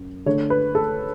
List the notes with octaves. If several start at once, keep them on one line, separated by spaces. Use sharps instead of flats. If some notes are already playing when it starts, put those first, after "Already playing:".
Already playing: F#2
D3 A3 D4 C#5
B4
A4